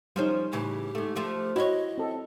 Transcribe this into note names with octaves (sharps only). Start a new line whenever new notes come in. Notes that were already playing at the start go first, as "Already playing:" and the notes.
F3 G3 C#4 D#4 C5
A2 C#3 E3 G4
G#2 A3
F3 A3 D4
E4 F#4 C#5 D#5
C4 A4